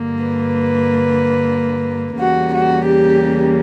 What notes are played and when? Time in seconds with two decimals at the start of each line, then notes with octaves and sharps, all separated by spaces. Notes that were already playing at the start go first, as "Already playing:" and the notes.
Already playing: G2 D3 A#3
0.24 B4
2.19 E2 C#3 G3 A#3 F#4
2.52 F#4
2.85 G4